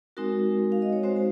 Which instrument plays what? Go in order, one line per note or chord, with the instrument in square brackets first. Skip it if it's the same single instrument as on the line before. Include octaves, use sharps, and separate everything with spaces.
[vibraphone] G#3 C4 D#4 F#4 A#4
F5
D#5
C#5
G#3 C4 D#4 F#4 C5
C5